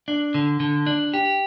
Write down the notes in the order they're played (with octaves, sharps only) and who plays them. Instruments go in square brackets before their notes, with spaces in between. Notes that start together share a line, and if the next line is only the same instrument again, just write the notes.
[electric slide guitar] D4
D3
D3
D4
G4